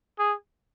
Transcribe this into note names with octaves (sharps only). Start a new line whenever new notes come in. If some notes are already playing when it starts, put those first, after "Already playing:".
G#4